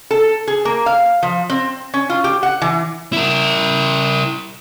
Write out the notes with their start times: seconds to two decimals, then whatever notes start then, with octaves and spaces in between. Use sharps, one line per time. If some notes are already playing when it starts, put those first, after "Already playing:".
0.11 A4
0.47 G#4
0.65 A#3
0.86 F5
1.23 F3
1.50 C4
1.94 C#4
2.10 F4
2.24 G4
2.43 F#5
2.62 E3
3.13 E4 A#4